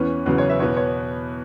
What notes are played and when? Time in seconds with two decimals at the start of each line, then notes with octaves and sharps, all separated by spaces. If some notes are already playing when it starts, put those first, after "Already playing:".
Already playing: E2 E3 C#4 B4
0.26 E2 C#3 F#3 B4
0.38 C#5
0.49 B4 E5
0.60 E2 B2 B3 C#5
0.68 B4
0.77 C#5